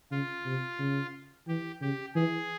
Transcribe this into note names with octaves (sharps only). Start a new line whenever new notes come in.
C#3 F4
C3
C#3
E3 G4
C#3 G4
E3 G#4